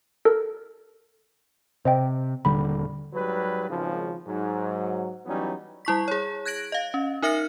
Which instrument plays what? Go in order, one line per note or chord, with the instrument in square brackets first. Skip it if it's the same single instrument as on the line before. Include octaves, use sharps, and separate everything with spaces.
[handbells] A4 A#4
[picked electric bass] C3 [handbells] C5 D#5 G5
[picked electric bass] D#1 D3 G3 [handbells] B5
[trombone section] G#2 F#3 G3 B4
G#1 C#3 F3
G#2 F#3
E3 F#3 G3 B3 C#4 D#4
[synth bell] G3 E4 C#6 B6
G#4 C#5
F#6 G#6 A#6 D7 F#7
D#5 F5
C#4
D#4 A#4 E5 F6 A#6 C#7